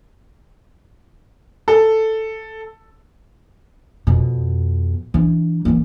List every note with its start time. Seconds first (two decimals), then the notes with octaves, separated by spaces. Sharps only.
1.68 A4
4.07 F2 B2
5.14 E3 D4
5.65 E3 A#3